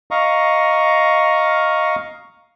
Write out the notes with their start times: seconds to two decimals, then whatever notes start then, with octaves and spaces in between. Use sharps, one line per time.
0.11 D#5 F5 A#5 C#6